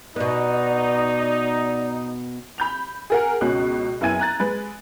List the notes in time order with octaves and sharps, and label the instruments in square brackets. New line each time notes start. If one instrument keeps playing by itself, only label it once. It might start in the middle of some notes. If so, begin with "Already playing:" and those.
[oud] B2 B3 [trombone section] D#4 [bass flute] D5
[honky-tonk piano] B5 G6 F7
G#4 A#4 F#5
C#2 B2 C#4 F#6
F#1 B3 E4 G#5 G#6 D#7
A#5 F#6 A6
G#3 B4